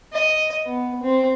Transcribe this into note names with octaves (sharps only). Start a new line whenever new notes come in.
D#5
B3
C4